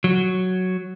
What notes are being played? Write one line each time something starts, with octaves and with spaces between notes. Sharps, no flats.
F#3